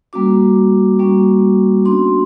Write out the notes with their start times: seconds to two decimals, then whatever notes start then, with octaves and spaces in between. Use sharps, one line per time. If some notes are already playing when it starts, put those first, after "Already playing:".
0.13 G3 A#3 C#4 F#4 D6
0.99 G3 A#3 C#4 F#4
1.85 B3 D4 F#4 C6